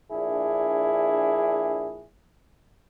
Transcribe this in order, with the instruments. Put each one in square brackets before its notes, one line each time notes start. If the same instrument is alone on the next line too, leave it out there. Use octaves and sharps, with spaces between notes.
[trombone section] A#1 D4 E4 G#4